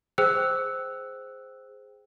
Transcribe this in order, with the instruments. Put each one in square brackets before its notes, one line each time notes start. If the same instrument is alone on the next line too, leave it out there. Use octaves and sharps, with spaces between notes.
[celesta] G#4 C5 G5 E6 F#6